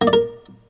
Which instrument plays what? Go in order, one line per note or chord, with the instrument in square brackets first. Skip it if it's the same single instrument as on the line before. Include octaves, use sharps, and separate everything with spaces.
[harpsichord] A#3
D5
A#4